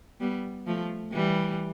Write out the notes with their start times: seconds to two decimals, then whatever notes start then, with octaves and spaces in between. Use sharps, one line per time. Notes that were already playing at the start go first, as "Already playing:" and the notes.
0.20 G3 B3
0.67 F3 A3
1.12 E3 G3